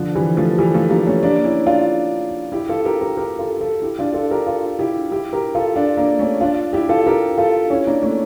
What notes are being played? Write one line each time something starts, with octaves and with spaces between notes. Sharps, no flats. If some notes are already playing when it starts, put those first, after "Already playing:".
Already playing: D3 F3
E3 G3
F3 A3
E3 G3
F3 A3
G3 A#3
A3 C#4
A#3 D4
C#4 E4
D4 F4
E4 G4
F4 A4
G4 A#4
G4 A#4
G4 A#4
F4 A4
F4 A4
E4 G4
D4 F4
F4 A4
G4 A#4
F4 A4
E4 G4
E4 G4
G4 A#4
F4 A4
D4 F4
A#3 D4
A3 C#4
D4 F4
E4 G4
F4 A4
G4 A#4
F4 A4
C#4 E4
A#3 D4
A3 C#4